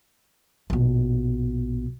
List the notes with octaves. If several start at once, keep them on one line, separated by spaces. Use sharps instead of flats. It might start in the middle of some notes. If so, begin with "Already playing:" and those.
A#1 B2